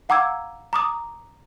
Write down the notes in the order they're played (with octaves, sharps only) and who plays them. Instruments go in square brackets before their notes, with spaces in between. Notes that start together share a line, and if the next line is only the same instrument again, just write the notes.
[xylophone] F5 F#5 A#5 D6 E6 G#6
A#5 D6 D#6